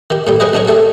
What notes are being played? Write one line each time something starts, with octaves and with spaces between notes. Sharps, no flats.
D#3 G4
A2 G3 G4
F#3 G#3 G#4 B4 C5 D#5
B1 D4 D#4 G#4 C#5
G3 A3 G4 A4